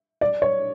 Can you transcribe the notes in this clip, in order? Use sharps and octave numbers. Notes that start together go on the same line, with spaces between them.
D5
C#5